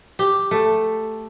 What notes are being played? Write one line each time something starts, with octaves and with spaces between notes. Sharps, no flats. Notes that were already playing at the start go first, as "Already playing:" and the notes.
G4
A3